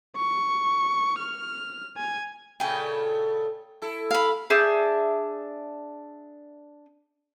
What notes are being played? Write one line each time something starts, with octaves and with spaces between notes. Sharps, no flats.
C#6
F6
G#5
A#2 C#3 A3 G5 G#5
E4 A4
F5 B5
D4 G#4 E5 G6